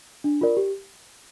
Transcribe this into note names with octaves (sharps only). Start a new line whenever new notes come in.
D4
F4 A#4 D5
G4